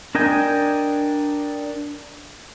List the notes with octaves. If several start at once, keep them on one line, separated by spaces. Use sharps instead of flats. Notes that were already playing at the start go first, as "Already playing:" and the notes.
D4 A#4 D#5 G5 G#5